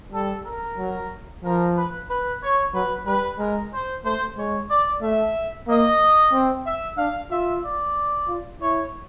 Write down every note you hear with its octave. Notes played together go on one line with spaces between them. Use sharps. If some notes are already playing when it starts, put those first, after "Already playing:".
G3 A4
A#4
F#3
F3 A#4
B4
B4
C#5
F#3 B4
G3 B4
G#3 A#4
C5
A3 C5
G#3 C#5
D5
A3 E5
A#3 D#5
C4
E5
D4 F5
F4 E5
D5
F4
E4 C#5